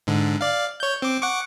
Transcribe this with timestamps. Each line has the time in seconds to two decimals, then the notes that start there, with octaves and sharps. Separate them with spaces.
0.07 G#2 D3
0.41 D5 F5
0.80 C#5 G6
1.02 C4 D6
1.21 F#5 C#6 D6